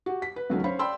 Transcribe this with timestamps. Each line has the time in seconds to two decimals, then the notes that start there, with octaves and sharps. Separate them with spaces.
0.06 F#4 G4
0.22 B6
0.36 B4
0.50 C#2 D#3 F#3 A3 C#4
0.64 C#4 C5 C#5 F5 B5
0.79 D5 G5 B5 C6 E6